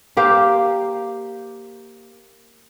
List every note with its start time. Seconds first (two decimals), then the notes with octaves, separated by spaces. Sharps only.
0.17 A#3 G4 C5 F5